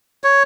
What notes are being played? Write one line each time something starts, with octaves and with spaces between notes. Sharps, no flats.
C#5